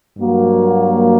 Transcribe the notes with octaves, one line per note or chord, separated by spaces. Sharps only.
G2 F#3 A#3 F#4